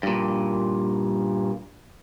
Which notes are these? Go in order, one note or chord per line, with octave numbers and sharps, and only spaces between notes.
G2 A#2